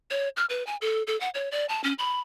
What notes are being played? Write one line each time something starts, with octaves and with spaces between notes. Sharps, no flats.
C#5
F6
B4
G#5
A4
A4
F#5
C#5
D5
A5
C#4
B5